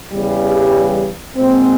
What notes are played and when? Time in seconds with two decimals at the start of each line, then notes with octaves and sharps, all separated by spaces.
0.13 E2 C#3 E3 G3
1.37 A#2 G#3 C4